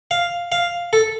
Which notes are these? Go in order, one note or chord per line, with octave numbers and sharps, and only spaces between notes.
F5
F5
A4